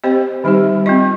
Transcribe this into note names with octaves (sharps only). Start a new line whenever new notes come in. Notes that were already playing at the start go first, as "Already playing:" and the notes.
C4 G4 C5 D#5
D#3 G3 D#4 G4
C4 F4 D#5